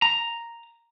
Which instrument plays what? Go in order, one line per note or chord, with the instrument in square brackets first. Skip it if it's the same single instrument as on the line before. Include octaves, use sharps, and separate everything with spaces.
[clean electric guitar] A#5